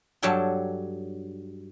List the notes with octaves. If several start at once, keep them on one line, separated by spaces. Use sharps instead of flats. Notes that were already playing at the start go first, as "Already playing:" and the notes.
G2 F#3 D4 A4 C#5 G5